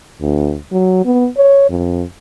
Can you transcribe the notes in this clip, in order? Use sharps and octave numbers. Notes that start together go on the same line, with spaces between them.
D2
F#3
B3
C#5
F2